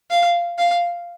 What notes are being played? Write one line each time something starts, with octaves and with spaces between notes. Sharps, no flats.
F5
F5